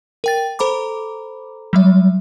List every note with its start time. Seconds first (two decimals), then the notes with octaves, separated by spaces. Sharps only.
0.24 A#4 G5 A6
0.59 A4 C5 A#5 B5 D6
1.73 F#3 G3 E5